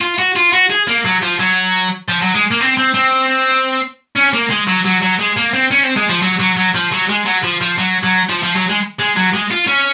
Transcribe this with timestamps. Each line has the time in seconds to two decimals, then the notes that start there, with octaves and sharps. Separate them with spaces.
0.01 F4
0.19 F#4
0.36 F4
0.53 F#4
0.70 G#4
0.88 A#3
1.05 F#3
1.22 F3
1.39 F#3
2.09 F3
2.22 F#3
2.35 G#3
2.51 A#3
2.61 C4
2.77 C4
2.94 C4
4.16 C#4
4.33 A#3
4.50 G#3
4.67 F#3
4.85 F#3
5.02 F#3
5.19 G#3
5.37 A#3
5.54 C4
5.71 C#4
5.83 C4
5.96 G#3
6.09 F3
6.22 F#3
6.40 F#3
6.57 F#3
6.75 F3
6.92 F#3
7.09 G#3
7.26 F#3
7.43 F3
7.61 F3
7.78 F#3
8.03 F#3
8.29 F3
8.42 F3
8.55 F#3
8.69 G#3
8.99 G#3
9.16 F#3
9.34 G#3
9.51 F4
9.67 C#4